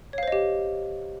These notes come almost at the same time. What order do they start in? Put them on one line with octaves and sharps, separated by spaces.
C#5 F5 C5 D#5 G4